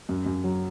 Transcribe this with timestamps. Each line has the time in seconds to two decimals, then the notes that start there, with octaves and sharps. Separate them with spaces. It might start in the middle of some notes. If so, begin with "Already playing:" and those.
0.09 F#2
0.26 F#2
0.44 F#3